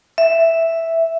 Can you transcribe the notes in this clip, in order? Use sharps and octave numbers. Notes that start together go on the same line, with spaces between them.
E5